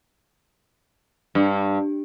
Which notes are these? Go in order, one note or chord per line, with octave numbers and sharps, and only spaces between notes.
G2